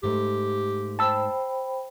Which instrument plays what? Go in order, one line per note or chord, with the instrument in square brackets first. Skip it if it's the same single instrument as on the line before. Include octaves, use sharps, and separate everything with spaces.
[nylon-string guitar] G#2 A3 [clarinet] G4
[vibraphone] C5 G5 B5 [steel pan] A5 E6